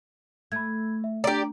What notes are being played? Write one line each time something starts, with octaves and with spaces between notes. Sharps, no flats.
A3 B5 G#6
E5
D4 G4 D5 A#5